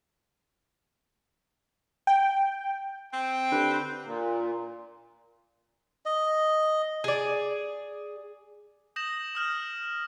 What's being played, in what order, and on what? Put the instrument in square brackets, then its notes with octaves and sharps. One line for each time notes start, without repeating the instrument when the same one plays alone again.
[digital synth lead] G5
[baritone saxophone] C4 [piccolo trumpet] G5
[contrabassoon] D3 [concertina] G4 B4
[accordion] A#2
[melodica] D#5
[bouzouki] G#4 D5
[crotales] D#6 G6 A#6 E7 F#7
D#6 F6 G6